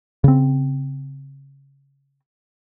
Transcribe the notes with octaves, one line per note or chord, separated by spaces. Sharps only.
C#3 C4